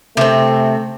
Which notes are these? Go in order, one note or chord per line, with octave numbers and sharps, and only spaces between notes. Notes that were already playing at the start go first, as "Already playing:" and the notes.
C3 A3 C4